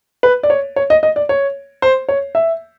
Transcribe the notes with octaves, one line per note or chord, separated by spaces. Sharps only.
B4
D5
C#5
C#5
D#5
D#5
D5
C#5
C5
C#5
E5